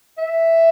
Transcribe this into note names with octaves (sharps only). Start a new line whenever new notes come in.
E5